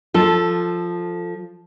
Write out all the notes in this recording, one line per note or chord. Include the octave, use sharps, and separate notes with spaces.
F3 A4